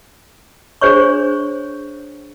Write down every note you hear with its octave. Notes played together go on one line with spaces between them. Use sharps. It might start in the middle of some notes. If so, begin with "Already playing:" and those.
D4 G#4 C5 C#5 C#6